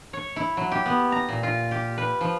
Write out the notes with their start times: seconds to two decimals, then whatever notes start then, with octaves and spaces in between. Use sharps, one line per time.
0.13 C#5
0.36 E4
0.57 F#3
0.72 G4
0.86 B3
1.12 A#5
1.29 A#2
1.43 F4
1.71 G4
1.98 B4
2.21 F3